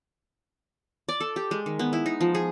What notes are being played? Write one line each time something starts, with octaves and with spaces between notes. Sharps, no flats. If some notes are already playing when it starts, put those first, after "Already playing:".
D5
A4
G4
G#3
D#3
B3
E4
D#4
F3
G#4